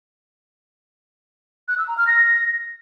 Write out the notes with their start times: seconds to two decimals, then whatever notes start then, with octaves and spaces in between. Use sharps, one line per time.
1.68 F#6
1.78 E6
1.88 A#5
1.98 F6
2.07 A#6